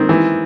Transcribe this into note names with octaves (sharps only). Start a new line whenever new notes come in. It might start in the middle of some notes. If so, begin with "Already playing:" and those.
Already playing: D#3 C4
E3